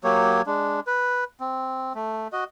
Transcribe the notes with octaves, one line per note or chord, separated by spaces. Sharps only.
F#3 A#3 G4 C#5
G#3 D4
B4
C4
A3
F#4 D#5